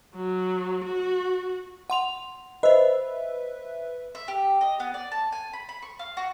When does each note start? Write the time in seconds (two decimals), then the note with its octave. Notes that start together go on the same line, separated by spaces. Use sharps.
0.15 F#3
0.85 F#4
1.90 F#5 C6 F7
2.63 B4 C5 D#5 E5
4.15 E5
4.28 G4
4.61 D#5
4.80 B3
4.94 D5
5.12 A5
5.32 G#5
5.53 B5
5.69 B5
5.82 C#6
5.99 F5
6.17 F#4